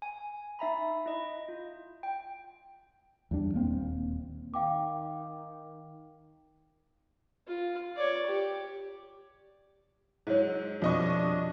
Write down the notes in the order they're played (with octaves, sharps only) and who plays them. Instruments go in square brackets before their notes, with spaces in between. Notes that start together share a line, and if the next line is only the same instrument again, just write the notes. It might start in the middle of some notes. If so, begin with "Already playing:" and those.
[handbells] G#5
D#4 E5 A#5 B5
E4 D#5
F4
G5
[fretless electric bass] E2 G3 D4
D#1 A#3 C4
[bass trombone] D#3 [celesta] F5 G5 D6
[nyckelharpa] F4
C#5 D5
G4
[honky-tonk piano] G#2 F#3 [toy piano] E4 C#5
[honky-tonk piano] C2 D#5 C#6 [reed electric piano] F2 B2 F3 [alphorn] D4